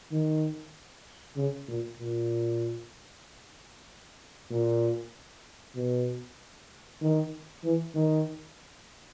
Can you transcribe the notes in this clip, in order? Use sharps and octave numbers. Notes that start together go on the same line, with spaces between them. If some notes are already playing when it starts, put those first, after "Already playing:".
D#3
C#3
A#2
A#2
A#2
B2
D#3
E3
D#3